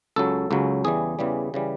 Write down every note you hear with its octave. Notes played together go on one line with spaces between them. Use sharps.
C#2 C#3 F#3 A4
C#2 C#3 F#3
E2 C#3 E3 G3 G#4
E2 C#3 E3 G3
C#3 E3 G3